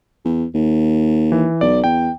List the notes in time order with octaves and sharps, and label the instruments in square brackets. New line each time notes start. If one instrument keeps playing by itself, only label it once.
[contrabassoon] E2
D#2
[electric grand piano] E3
[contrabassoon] B1 [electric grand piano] D5
[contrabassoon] E2 [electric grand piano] G5